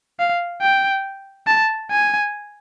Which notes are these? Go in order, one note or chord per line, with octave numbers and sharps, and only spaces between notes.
F5
G5
A5
G#5